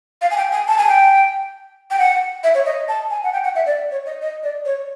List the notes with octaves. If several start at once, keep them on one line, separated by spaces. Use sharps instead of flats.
F5
G#5
G5
G#5
A5
G#5
G5
G5
F#5
E5
C#5
D#5
A5
G#5
F#5
G5
F#5
E5
D5
C#5
D#5
D#5
D5
C#5